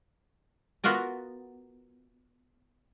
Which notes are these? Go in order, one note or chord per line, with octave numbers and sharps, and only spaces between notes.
B3 F4 F#4 A#4 D5